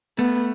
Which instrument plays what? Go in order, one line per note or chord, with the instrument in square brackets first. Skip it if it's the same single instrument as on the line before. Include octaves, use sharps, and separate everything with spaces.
[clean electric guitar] A3 [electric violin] B3